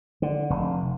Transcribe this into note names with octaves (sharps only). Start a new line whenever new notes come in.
D3
F1